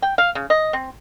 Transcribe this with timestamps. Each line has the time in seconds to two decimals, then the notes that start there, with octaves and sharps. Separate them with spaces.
0.02 G5
0.18 F5
0.35 C#3
0.50 D#5
0.73 C4